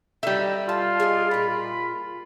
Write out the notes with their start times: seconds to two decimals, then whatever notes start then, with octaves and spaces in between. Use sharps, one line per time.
0.23 D3 G3 D#4 E5
0.69 F4 A5
1.00 G#4 D5 D#5
1.31 A#2 F4 B5